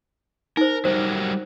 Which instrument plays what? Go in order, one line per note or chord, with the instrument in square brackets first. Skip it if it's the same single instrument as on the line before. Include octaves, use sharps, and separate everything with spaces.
[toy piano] D#4 C5 [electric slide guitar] A#4
[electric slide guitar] F#3 G3 A#4 [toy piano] C5